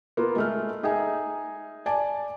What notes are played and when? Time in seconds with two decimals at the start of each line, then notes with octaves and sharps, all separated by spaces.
0.17 A#3 B3 F4
0.36 G#3 A3 F6
0.83 D#4 G#4 D#5 E5 G#5
1.86 D5 G#5 A5